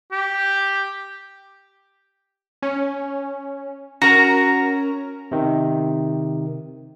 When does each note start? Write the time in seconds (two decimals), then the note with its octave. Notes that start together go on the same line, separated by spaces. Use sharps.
0.12 G4
2.62 C#4
4.02 C#4 F#4 A#4 A#5 A#6
5.31 C3 D#3